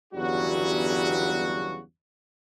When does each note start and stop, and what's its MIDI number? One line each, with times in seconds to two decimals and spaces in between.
0.14 1.80 31
0.14 1.80 40
0.14 1.80 49
0.14 1.80 54
0.14 1.80 55
0.14 1.80 66